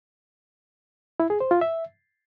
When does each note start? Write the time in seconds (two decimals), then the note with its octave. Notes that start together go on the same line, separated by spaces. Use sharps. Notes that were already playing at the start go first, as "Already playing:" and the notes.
1.20 E4
1.30 G#4
1.40 C5
1.51 F4
1.61 E5